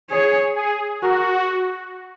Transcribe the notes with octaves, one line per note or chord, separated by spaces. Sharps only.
G#4 C#5
G#4
F#4 A#4